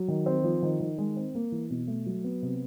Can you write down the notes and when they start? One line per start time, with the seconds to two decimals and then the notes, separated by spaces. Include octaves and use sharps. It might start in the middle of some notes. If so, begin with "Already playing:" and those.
Already playing: F#3
0.08 D#3
0.26 C4
0.44 F3
0.63 D#3
0.80 D#3
0.98 G#3
1.16 C4
1.35 A#3
1.52 E3
1.70 B2
1.87 A3
2.06 F#3
2.24 B3
2.42 C3